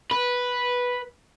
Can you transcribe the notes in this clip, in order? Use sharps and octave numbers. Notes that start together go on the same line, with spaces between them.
B4